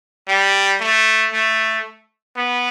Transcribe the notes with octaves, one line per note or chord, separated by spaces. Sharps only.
G3
A3
A3
B3